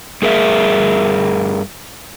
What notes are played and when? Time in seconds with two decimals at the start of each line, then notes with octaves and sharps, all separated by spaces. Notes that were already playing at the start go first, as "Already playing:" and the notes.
0.22 G2 G#4 A#4 E5